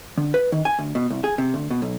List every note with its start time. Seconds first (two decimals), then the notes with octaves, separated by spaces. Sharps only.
0.17 D3
0.34 B4
0.52 D#3
0.65 G#5
0.79 D2
0.95 B2
1.10 C2
1.24 G#4
1.38 C3
1.54 D2
1.71 B2
1.82 B1